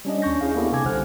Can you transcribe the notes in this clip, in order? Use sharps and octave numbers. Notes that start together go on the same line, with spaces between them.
G3 C#4 D4 D#5
D#2 C#4 D4 C#6 G6 A#6
C#4 E4 G#4 F5
A#3 B3 D4 E4 G4 A4
C3 A4 G#5 D6 G#6
C2 D3 C5 F#5 F6 F#6